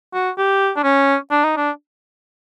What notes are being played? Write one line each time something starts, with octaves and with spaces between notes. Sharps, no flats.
F#4
G4
D4
C#4
D4
D#4
D4